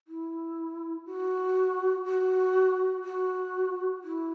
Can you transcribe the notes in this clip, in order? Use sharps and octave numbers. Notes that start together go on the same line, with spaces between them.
E4
F#4
F#4
F#4
E4